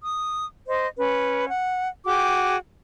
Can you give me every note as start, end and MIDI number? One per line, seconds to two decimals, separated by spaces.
0.02 0.44 87
0.67 0.86 72
0.67 0.86 75
0.97 1.48 61
0.97 1.48 71
1.49 1.86 78
2.05 2.56 66
2.05 2.56 68
2.05 2.56 79
2.05 2.56 86